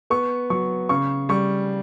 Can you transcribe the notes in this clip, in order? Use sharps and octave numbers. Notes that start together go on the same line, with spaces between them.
B3 C#6
F#3 C#6
C#3 C#6
G3 C#6